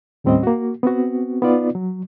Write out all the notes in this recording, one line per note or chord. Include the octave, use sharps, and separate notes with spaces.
D#2 A2 G3 C4 C#4 D#5
A#3 F#4
B3 C4 F#4
B3 D#4 F4 D5
F#3